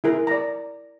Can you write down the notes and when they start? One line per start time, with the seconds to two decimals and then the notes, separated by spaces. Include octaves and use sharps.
0.04 E4 G#4 A#4
0.27 D5 A#5